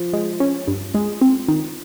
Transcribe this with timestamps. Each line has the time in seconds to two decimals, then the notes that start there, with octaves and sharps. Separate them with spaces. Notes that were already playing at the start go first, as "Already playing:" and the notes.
Already playing: F3
0.13 G#3
0.40 C#4
0.67 G2
0.95 G#3
1.21 C4
1.48 D#3